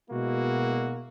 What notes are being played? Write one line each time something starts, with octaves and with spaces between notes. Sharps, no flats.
B2 G#3 A#3 E4 F#4